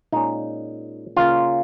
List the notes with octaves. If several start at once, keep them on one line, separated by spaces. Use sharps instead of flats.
A#2 G#3 C#4 D#4
C#3 A#3 C#4 F4